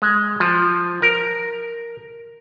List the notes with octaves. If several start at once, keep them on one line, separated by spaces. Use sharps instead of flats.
G#3
F3
A#4